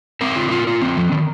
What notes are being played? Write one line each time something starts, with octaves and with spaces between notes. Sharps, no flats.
C4 A#4
F4
F4
F4
C4
F3
D#3